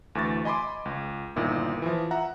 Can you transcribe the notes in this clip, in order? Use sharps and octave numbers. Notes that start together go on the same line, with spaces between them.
D2 E3 C#6 A6
D#5 G#5 B5 C6 D6
C#2
G1 A#2 D#3 E4
E3 F3
E5 F#5 A#5